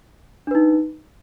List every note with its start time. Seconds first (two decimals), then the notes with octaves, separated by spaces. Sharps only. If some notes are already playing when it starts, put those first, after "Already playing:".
0.47 D4
0.51 B4
0.55 D#4